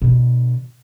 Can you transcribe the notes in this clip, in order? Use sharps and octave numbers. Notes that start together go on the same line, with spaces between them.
B2 D3